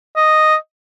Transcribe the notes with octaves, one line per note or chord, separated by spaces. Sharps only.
D#5